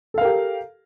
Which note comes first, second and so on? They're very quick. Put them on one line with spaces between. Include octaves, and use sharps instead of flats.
A4 F5 A#4 G4